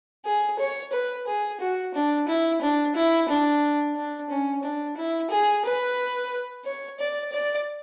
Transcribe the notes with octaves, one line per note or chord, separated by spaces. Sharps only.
G#4
C#5
B4
G#4
F#4
D4
E4
D4
E4
D4
D4
C#4
D4
E4
G#4
B4
C#5
D5
D5